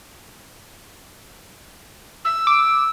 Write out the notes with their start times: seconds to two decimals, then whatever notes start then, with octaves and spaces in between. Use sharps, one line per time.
2.25 E6
2.47 D6